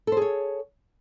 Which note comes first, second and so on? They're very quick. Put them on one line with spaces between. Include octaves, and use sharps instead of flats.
A4 C5 G#4 C#5